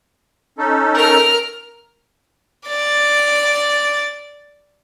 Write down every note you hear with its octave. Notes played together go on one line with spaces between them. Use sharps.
C#4 D#4 A4
A#4 F6
D5 A6